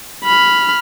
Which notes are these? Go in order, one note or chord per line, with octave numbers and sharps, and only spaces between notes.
B5 F6